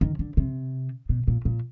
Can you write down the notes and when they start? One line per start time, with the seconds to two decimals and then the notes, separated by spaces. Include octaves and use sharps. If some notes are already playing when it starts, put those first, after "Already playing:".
0.01 D#3
0.19 D3
0.37 C3
1.09 B2
1.28 A#2
1.45 A#2